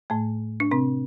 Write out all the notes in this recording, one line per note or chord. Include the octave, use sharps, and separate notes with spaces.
A2 A3
D4
C3 C4